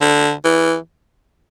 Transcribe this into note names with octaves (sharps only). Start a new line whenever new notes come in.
D3
E3